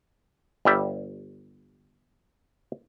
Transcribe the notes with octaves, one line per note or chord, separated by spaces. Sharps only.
G1 G3 E5